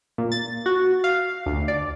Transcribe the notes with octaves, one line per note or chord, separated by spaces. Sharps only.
A#2
A6
F#4
F5
D2
D5